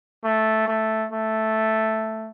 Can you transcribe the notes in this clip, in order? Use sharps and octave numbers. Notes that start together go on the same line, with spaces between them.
A3
A3
A3